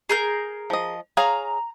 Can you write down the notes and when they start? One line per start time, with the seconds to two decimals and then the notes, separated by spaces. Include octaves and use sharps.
0.09 G#4 A#4 G6
0.70 F3 D#5
1.17 G#4 C#5 F5 A#5